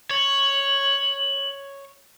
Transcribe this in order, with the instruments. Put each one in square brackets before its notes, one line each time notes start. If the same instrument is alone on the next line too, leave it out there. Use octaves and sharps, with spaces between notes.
[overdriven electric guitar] C#5 [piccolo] F#7